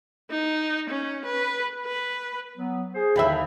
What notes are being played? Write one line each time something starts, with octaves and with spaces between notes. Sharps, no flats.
D#4
C#4
B4
B4
F#3 B3
G#4 C5
D#2 D3 E3 E5 G5 B5